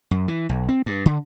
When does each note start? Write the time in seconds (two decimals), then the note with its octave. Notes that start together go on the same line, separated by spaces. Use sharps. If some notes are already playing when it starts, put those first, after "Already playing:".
0.11 F#2
0.28 E3
0.49 B1
0.69 C4
0.86 G2
1.06 D3